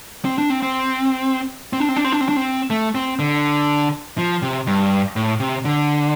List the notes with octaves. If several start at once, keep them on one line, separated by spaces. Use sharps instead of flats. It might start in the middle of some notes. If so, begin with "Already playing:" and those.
C4
D4
C4
C4
C4
D4
C4
D4
C4
D4
C4
D4
C4
A3
C4
D3
F3
C3
G2
A2
C3
D3